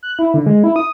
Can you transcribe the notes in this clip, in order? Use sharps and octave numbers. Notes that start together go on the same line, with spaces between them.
F#6
E4
D3
G#3
E4
D#6